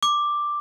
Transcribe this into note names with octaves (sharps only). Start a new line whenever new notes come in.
D6